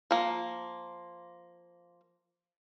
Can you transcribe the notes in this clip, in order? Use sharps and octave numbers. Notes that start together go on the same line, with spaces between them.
F3 A#3